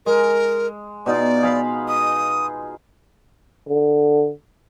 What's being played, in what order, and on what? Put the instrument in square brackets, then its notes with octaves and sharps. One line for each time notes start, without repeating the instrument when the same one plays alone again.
[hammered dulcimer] G#3 [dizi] A#4
[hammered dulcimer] B2 D#4 F4 [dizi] D5
[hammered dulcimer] G#4 F5 B5
[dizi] D#6
[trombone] D3